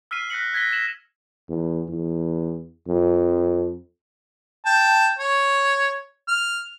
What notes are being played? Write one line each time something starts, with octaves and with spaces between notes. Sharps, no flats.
E6 F6 B6 C7 D#7
F#6 A#6 B6 C#7 F#7
F#6 G#6 A#6 B6 G7
A#6 E7 F#7
E2
E2
F2
G5 A5
C#5
F6